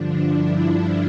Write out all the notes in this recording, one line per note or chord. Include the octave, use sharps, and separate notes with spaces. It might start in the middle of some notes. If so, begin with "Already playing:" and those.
Already playing: G2 D3 F3 D4
E4
D4 F4